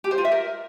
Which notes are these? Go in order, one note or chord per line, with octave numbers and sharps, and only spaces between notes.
G4
C5
F4
E5
A#4